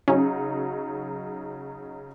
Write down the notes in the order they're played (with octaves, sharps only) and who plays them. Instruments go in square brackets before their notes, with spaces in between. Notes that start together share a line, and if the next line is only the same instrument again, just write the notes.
[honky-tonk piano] C#3 F#3 D#4 [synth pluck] C#4